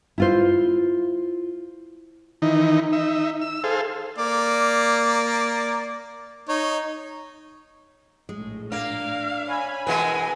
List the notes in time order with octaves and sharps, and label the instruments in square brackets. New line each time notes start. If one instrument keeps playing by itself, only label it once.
[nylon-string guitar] E4 F4 C5
[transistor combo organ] D#3 E3 D#4
D#4 E5
E6
G#4 A4 C5 F5
[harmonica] A#3 D5
D#4 C#5
[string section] A#1 A2 [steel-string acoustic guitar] G#3
[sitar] A#3 [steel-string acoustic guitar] D4 [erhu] F5
[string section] C#5 G#5 B5
[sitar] B2 E3 G#3 [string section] A#4 [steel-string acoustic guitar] B4 F#5 [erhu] G#5